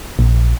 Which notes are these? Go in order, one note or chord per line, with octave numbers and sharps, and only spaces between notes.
A#1